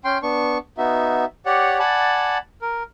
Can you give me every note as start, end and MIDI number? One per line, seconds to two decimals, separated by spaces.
0.04 0.18 61
0.04 0.18 79
0.04 0.18 84
0.23 0.58 59
0.23 0.58 62
0.23 0.58 85
0.78 1.25 59
0.78 1.25 63
0.78 1.25 66
0.78 1.25 76
1.46 1.79 67
1.46 1.79 73
1.46 1.79 74
1.46 1.79 78
1.79 2.38 74
1.79 2.38 78
1.79 2.38 80
1.79 2.38 81
1.79 2.38 83
2.62 2.83 70